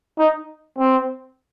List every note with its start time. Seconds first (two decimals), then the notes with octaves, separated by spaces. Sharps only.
0.19 D#4
0.78 C4